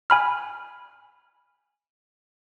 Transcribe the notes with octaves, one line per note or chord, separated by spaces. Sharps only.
G#5 B5 F6